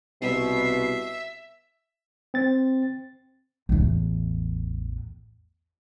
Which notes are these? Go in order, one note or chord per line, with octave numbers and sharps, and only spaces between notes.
C2 B2 E5 C7
C4 A6
A1 E2